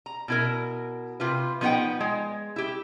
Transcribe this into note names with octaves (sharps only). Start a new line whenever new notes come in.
A#5
B2 E4 A#4
C3 F4 B4
F3 B3 D#4 A4 F#5 G5
G#3
E4 G4